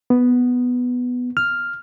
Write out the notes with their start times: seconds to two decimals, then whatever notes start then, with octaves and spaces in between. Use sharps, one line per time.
0.10 B3
1.37 F6